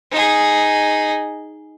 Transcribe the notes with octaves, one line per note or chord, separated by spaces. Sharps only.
D#4 G#4